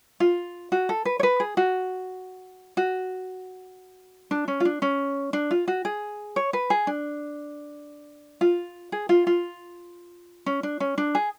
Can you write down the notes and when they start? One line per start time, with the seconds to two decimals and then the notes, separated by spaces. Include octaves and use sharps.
0.20 F4
0.72 F#4
0.89 A4
1.05 B4
1.19 C#5
1.23 B4
1.40 G#4
1.57 F#4
2.77 F#4
4.31 D4
4.48 C#4
4.60 F4
4.65 D4
4.82 C#4
5.33 D4
5.51 F4
5.68 F#4
5.85 G#4
6.36 C#5
6.53 B4
6.70 G#4
6.87 D4
8.41 F4
8.92 G#4
9.09 F4
9.27 F4
10.46 C#4
10.63 D4
10.80 C#4
10.98 D4
11.15 G#4